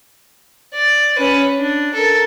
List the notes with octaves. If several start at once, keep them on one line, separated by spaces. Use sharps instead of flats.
D5
C#4 B4
D4
A4 A#4